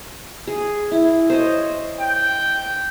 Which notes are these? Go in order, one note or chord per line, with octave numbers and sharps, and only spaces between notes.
G#4
E4
C5 C#5 D#5
G5